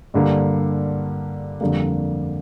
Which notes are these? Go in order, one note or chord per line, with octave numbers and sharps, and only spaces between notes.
G2 D3 G3 A#3
F2 D3 G3 A#3